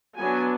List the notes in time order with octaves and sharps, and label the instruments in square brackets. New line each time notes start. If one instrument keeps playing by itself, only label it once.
[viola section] F#3 B3 D4 G#5